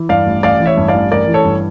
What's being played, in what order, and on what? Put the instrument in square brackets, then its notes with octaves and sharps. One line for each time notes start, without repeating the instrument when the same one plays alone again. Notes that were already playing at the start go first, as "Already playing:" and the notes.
Already playing: [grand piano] E3
G2 D5 F5
A1
A1 D5 F5
E3
C#5 E5
G2
D5 F5
A1
A1 A#4 D5
E3
A4 C#5
G2